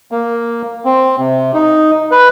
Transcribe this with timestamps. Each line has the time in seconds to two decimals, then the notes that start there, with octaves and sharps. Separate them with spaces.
0.12 A#3
0.85 C4
1.19 C3
1.54 D#4
2.11 B4